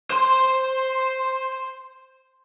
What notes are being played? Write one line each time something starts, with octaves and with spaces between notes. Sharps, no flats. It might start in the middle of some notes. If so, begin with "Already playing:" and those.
C5 C6